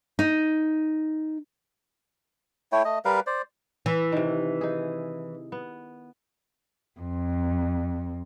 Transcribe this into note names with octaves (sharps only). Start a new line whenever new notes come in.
D#4
A3 E4 C#5 G5
A3 D#5
G3 A#4 B4 F5
C5 D5
E3
C3 D#3
D#4 G#4
B3
F2